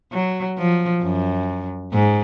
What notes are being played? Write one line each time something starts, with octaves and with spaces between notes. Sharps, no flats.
F#3
F3
F#2
G#2